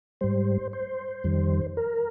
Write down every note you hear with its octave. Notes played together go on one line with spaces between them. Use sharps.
G#2 G3 C5
C5
F2 D#3 G3
A#4